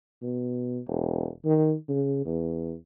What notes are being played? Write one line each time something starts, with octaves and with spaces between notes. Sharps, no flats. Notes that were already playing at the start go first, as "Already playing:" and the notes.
B2
E1
D#3
C#3
E2